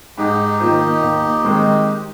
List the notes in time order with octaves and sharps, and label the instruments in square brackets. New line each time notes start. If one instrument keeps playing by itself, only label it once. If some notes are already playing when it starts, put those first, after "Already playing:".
[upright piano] G#2 [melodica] D#4 G4
[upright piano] D#3 A#3 F4 C5
D#2
D#3 G#3 C4